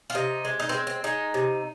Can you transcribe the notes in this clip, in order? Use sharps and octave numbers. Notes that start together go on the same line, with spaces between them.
F4
C3 D#4
G#3
D#4
C4
G#3
C4
G#3 D#4
C3